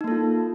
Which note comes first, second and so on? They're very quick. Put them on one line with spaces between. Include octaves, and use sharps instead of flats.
D#4 A#3 A4 F4